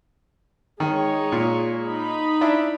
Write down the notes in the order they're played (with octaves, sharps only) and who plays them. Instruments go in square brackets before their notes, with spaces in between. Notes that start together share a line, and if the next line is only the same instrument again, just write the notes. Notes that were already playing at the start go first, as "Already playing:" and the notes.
[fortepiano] D#3 [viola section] G#3 D#4 C#5
[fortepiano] A#2
[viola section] D#4 B5
[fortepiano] D4 E4